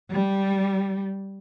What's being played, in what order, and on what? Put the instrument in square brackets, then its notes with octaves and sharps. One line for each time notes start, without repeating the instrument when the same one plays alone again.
[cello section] G3